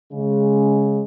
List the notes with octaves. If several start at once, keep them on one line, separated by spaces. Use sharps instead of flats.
C#3 G#3